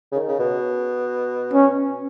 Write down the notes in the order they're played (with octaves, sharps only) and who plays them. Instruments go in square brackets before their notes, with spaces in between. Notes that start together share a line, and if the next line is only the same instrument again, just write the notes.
[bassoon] C#3
D#3
C#3
B2
[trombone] C#4